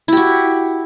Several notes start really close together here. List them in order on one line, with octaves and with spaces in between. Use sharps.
E4 G4 F#4